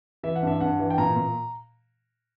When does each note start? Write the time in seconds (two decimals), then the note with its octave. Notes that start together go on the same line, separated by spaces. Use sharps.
0.23 E3 E5
0.36 F#5
0.43 G2 E5
0.60 G2 F#5
0.79 E3
0.90 G5
0.98 A#2 A#5
1.16 A#2